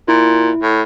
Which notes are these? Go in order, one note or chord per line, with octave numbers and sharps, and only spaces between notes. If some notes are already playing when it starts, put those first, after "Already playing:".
A#2 E4
A2